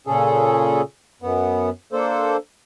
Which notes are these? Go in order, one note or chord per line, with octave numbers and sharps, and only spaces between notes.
A#2 C#3 C#4 G#4 A4
F#2 B3
A#3 D4 A4 C5